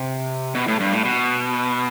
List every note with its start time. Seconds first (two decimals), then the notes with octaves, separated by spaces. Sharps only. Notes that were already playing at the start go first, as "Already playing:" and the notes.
Already playing: C3
0.55 B2
0.68 A2
0.80 G2
0.93 A2
1.05 B2